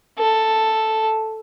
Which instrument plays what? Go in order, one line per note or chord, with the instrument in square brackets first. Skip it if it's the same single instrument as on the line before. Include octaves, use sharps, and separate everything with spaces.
[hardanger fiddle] A4